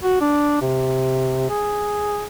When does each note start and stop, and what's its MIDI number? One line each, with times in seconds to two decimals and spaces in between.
0.04 0.20 66
0.21 0.60 62
0.61 1.46 48
1.49 2.26 68